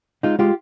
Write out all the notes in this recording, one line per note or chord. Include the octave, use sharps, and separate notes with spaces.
G#3 D#4 F4
G#3 F4 G4